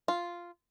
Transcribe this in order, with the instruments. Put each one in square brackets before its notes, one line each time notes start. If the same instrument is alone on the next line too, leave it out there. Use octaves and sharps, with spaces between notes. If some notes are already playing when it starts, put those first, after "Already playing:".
[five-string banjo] F4